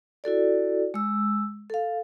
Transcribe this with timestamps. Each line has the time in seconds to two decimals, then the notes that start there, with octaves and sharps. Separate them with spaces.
0.24 E4 F#4 A4 D5
0.94 G#3 E6
1.70 A4 F5